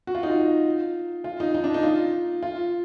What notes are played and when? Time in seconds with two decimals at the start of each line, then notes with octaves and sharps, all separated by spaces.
0.07 F#4
0.15 F4
0.23 D#4
0.30 F4
1.24 F4
1.40 D#4
1.54 D#4
1.64 D4
1.74 D#4
1.83 F4
2.43 F4